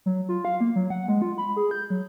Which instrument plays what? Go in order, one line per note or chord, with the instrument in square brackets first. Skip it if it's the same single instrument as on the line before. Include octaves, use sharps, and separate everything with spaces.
[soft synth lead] F#3
F4
F5
A#3
F#3
F#5
G#3
F4
B5
G#4
G6
F#3